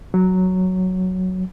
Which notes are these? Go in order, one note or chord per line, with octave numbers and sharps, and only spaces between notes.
F#3